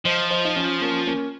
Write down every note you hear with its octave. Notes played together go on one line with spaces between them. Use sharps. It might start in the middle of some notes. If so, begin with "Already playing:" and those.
F3 C5 D#5
C5 D#5
D#4
C#4 F4
A#3 C#4
A#3 C#4